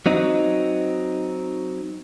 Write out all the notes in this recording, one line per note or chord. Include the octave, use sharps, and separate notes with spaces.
F#3 C4 D#4